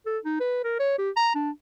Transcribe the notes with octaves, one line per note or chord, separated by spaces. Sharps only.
A4
D#4
B4
A#4
C#5
G4
A#5
D4